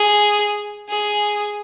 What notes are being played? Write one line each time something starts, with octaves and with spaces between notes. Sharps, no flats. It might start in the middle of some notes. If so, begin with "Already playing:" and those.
Already playing: G#4
G#4